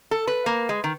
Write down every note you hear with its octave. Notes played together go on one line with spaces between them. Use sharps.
A4
B4
A#3
G#3
D#3